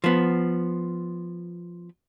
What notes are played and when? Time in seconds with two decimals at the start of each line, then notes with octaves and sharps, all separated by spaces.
0.04 F3 B3